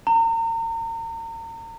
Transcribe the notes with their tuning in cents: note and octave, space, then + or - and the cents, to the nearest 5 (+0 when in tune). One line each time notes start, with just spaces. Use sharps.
A#5 -35